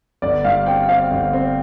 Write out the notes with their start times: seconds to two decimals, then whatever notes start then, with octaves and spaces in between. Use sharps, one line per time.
0.22 G1 D5
0.44 G2 F5
0.66 C4 G5
0.89 C4 F5
1.11 G1
1.33 C4